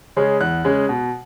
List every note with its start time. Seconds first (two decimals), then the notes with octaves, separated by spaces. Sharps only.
0.17 C#3 G#3 C#4
0.41 E2 F#6
0.64 C#3 G#3 C#4
0.89 B2